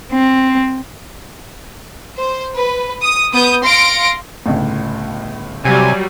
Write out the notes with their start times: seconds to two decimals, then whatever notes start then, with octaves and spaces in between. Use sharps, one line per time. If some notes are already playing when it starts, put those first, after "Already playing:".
0.12 C4
2.17 C5
2.55 B4
3.03 D#6
3.33 B3 D#6 G6
3.65 F5 C6 A#6 C#7 D7
4.46 G1 C#2 A2
5.65 C3 F#3 G3 G#5